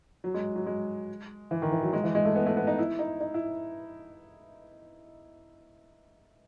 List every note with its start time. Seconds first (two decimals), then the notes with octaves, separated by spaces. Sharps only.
0.24 F#3
0.34 G#3
0.55 F#3
0.66 G#3
1.51 E3
1.62 D#3
1.72 E3
1.83 F#3
1.93 G#3
2.04 E3
2.15 G#3
2.25 A3
2.36 B3
2.46 A3
2.57 B3
2.67 D#4
2.79 E4
2.99 D#4
3.20 D#4
3.34 E4